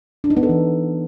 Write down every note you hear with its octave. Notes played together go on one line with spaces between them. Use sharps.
D4
D#4
B3
A4
E3